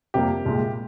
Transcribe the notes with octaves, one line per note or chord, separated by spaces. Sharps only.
F2 C3 G3 A#3 G4
C2 A#2 G#3